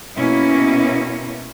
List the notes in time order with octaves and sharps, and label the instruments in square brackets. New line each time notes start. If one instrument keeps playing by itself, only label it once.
[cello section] B2 A#3 C#4 E4